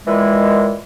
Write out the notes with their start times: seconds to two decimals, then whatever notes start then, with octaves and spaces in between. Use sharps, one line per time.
0.06 A#2 D#3 E3 G#3